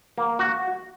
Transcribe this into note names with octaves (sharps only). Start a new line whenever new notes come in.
A#3
F#4